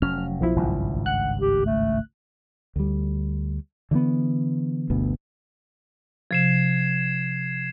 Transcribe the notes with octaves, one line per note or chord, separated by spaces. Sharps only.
F1 F#3 C#4 F6
B1 F3 E4
G#1 C#2 G2
F#5 F#6
G4
A3
D2 G3
D3 E3 A3 B3
G1 D2 B2 B3
C3 F3 G#6 C7 E7